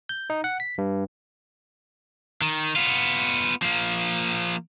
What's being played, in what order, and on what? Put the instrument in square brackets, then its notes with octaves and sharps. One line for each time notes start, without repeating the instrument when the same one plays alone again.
[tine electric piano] G6
D#4
F#5
B6
G2
[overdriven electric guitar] D#3
B3 F4
F3 A#3